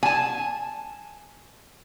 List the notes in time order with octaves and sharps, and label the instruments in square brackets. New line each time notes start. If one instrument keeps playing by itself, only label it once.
[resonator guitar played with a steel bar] G#5 A5